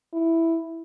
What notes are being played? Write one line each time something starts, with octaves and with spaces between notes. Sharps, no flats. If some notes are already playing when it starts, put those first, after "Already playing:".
E4